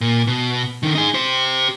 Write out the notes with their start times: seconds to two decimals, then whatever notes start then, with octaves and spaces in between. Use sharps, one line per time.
0.01 A#2
0.27 B2
0.83 D3 D#3
0.95 D#4 G#4
1.14 G4 C5